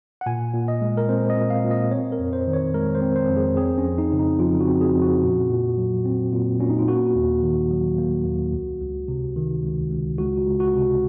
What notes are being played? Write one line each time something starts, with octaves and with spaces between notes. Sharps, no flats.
F#5
A#2 G#5
A#2
D#5
G#3
A#4
C4 C5
D#5
A#2
F5
A#2
D#5
C4 C#5
A#4
F2
C5
D#3
C#5
G#3 A#4
C5
C4
C5
F2
G#4
C4 G#4
C#4
F2
D#4
C#3
D#4
F3 F4
F#4
C4
G#4
F2
F#4
A#2
A#2
F#3
C4
A#2
A#2 C#4
D#4
F4
A#3 F#4
D#2
D#3
F#3
A#3
D#2
C#2
C#2
C3
D#3
C#2
C#2
C#2 F#4
C#2
F#4
C3